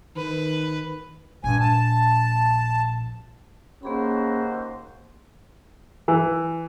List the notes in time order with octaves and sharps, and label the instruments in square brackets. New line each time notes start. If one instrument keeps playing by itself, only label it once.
[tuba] D#3 [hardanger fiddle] B4
[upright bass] A#1 [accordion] G2 G#5
[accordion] A5
[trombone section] D#2 F#4 C5 [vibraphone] A#3 G#4 B5 [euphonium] C#4
[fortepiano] E3